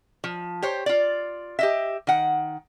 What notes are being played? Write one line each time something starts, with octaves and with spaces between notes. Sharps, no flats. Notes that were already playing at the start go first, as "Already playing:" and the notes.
F3
G4 C5 C#5
F4 D5
G4 D#5 E5
D#3 F#5